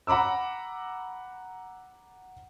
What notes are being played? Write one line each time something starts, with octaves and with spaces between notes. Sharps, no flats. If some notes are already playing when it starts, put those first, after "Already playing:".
F#5 A#5 B5 D6 E6